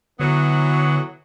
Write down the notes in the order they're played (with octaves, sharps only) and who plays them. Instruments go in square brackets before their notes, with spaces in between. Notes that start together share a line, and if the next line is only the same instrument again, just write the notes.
[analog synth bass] D3 [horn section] E3 F#3 B3